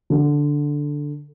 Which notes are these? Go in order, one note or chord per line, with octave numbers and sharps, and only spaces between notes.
D3